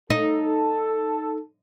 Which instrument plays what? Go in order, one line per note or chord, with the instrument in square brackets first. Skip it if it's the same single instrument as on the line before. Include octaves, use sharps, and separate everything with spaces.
[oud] D#4 [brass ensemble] A4